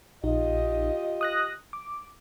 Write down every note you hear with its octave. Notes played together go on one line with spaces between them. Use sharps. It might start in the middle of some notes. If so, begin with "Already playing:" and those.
A#1 D#4 F4 G4 D#5
D#6 F#6 A#6
D6